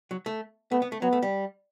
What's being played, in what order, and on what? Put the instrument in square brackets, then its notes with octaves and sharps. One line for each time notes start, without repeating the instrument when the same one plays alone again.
[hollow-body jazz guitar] F#3
A3
[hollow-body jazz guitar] A3 [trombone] B3
[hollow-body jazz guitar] B3
A3
[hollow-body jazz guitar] F#3 [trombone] B3
[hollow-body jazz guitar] A3
G3